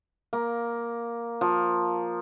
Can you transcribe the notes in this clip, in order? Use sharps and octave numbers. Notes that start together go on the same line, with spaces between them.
A#3
F3